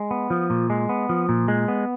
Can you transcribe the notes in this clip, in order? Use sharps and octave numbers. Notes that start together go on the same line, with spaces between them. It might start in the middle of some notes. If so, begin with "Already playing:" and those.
Already playing: G#3
B3
F3
A#2
G#3
B3
F3
A#2
G#3
B3